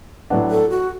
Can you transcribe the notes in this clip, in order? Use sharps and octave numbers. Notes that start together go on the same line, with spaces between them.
A2 F#3 B3 D4 F#4
A4
F#4